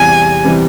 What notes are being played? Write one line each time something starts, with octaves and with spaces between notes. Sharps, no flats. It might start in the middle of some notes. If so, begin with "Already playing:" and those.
Already playing: E2 C3 E3 G3 G#5
C3 E3 G3